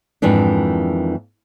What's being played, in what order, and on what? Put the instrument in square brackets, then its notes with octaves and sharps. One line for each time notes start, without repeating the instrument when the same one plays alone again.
[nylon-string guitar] F2 G#2 D#3 E3 D4